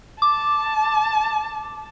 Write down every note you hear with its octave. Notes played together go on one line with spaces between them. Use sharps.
A5 D6